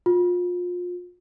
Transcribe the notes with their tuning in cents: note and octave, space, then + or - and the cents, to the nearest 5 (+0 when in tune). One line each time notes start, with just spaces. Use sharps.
F4 +30